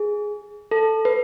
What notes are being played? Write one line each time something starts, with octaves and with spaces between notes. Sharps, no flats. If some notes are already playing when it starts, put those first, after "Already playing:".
Already playing: G#4
A4
B4